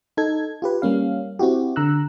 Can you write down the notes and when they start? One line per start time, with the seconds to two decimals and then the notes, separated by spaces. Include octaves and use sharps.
0.17 D#4 A4 G#6
0.62 F4 G4 B4
0.82 G3 A#3 C#4 F5
1.39 C4 E4 F#4 G4
1.76 D3 A#5 E6 F#6